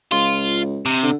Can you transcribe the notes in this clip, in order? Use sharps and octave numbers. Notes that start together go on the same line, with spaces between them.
C#2 F4
C3
D3